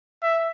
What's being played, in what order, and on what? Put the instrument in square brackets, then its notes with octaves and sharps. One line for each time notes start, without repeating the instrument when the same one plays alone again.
[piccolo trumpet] E5